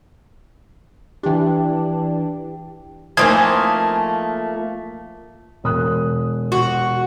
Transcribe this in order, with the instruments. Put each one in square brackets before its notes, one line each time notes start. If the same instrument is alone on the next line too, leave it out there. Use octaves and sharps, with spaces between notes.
[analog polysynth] E3 D4 [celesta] G4 G5
[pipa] E3 C4 D#4 [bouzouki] F3 A3 A#3 [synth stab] G#5
[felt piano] E1 D#6 F#6
[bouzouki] F#4